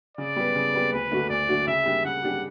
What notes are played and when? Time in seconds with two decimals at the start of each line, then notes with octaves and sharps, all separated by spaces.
0.17 C#3 D5
0.36 G3 B3
0.56 C#3
0.74 G3 B3
0.92 D2 B4
1.11 D3 A3 D4 F#4
1.29 D2 D5
1.49 D3 A3 D4 F#4
1.67 C#3 E5
1.86 G3 D4 G4
2.04 C#3 F#5
2.23 G3 D4 G4